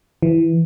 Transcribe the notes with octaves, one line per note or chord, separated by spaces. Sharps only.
E3